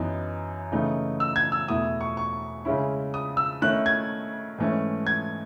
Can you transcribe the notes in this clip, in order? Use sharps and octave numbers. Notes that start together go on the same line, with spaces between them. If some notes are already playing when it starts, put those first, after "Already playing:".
Already playing: F#2 E3 B3 D#4
C#3 E3 A3 D#4
E6
G#6
E6
E2 B2 A3 E4 D#6
C#6
C#6
C#3 G#3 C#4 E4
D#6
E6
D#3 A3 C#4 E4 F#6
G#6
G#2 E3 A3 C#4
G#6